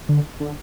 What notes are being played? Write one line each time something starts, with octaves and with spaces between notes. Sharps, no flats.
D3
D3